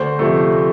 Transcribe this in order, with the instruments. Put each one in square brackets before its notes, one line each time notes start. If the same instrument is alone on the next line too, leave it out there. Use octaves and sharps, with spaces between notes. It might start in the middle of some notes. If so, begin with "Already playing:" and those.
Already playing: [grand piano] D2 C5
C3 F3 A3